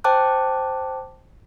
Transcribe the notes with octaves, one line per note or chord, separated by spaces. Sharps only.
C5 G5 A5 D6 F#6